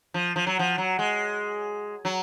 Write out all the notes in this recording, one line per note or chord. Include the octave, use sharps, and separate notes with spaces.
F3
F3
F#3
F3
F#3
G#3
F#3